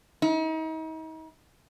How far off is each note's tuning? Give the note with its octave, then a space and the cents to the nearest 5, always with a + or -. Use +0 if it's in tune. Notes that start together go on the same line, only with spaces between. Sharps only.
D#4 +40